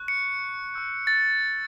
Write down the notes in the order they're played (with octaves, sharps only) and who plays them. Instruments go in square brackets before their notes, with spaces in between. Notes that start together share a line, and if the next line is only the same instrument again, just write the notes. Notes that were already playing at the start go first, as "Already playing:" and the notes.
Already playing: [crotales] C#6 F#6
C#7
C#6 E6 G6
A6